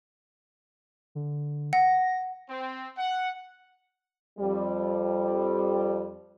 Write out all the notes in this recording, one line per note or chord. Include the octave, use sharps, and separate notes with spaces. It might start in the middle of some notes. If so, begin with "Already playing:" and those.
D3
F#5 A#6
C4
F#5
F2 G3